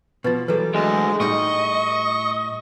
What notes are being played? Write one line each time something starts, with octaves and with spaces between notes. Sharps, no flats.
B2 F3 B4 A6
E3 F#3 G3 G#4 A4 B4
D2 G#3
A2 G3 D#4 D#5 C#6